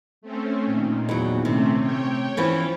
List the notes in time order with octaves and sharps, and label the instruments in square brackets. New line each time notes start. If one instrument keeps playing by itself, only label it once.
[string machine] A3 C4 C#4
A#2 D#3
[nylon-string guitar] E2 F#3
[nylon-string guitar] C3 [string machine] A3 C4 C#4
[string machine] C#5 G5
[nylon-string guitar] E3 F3 C#4